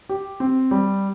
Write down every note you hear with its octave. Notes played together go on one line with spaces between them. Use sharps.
G4
C4
G3